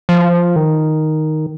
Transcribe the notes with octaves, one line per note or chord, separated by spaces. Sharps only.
F3
D#3